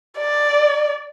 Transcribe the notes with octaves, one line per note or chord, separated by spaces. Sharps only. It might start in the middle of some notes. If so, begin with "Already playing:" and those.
D5